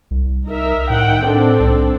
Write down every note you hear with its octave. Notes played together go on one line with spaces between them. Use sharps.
C2
D#4 A#4 E5
A2 D#3 F#5 G5
C4 D4 A4
C2